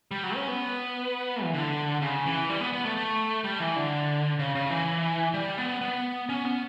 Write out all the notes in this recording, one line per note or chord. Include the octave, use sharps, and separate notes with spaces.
G3
F#3
C#4
B3
E3
D3
C#3
E3
G3
B3
B3
A3
A3
G3
E3
D3
C#3
C#3
E3
G3
B3
B3
C#4
B3